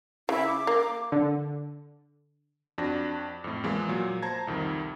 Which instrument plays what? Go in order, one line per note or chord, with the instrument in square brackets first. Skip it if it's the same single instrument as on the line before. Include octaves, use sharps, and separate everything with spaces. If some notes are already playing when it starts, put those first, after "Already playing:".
[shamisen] C#3 [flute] E4
[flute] D6
[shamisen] A#3
[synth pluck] D3
[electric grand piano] F2 D4 F#4 A#6
F2 A2
E2 F3 G#3 A#3
A#2 F#3
C5 A5 A#5 G#6
C2 F2 D#3